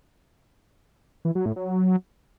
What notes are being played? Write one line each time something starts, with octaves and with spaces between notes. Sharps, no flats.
E3
F#3
A2
F#3